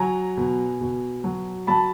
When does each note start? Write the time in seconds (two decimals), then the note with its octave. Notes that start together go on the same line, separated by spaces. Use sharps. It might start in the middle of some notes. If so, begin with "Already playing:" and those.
Already playing: F#3 G#5 A#5
0.37 B2
0.81 B2
1.24 F#3
1.67 F#3 A5 B5